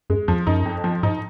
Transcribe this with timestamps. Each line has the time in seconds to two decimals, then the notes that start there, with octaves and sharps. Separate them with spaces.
0.10 F#2 G#3
0.28 F2 F3
0.47 F#2 D#4
0.65 F2
0.84 F3
1.03 G#2 D#4